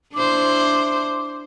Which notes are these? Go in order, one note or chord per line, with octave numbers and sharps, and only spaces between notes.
D4 E4 C5 D6